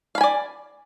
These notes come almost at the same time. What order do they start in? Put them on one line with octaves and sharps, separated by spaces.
F5 B5 G#5 D5